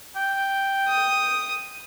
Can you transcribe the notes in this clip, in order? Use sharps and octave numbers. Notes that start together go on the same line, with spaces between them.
G5
D#6